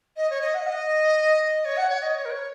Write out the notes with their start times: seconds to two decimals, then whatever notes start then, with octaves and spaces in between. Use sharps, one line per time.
0.16 D#5
0.30 C#5
0.41 D#5
0.54 F#5
0.67 D#5
1.65 C#5
1.77 F#5
1.89 C#5
2.02 D#5
2.15 C#5
2.25 A#4
2.31 C#5